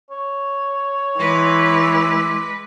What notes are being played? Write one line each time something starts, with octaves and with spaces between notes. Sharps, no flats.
C#5
E3 G#3 B4 C6 D6